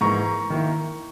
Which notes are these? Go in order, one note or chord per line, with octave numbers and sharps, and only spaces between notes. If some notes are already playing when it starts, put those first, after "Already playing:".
G#2 E3 A#3 A#5 C#6
D#3 A#3 E4